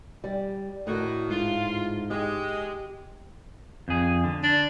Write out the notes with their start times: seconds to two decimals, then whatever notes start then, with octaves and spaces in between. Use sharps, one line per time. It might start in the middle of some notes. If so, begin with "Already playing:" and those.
0.24 G3
0.87 A2 D3 D#3 F#4
1.31 G#2 F4
2.11 G#3 G4
3.88 F2 G#4
4.24 D3
4.43 D4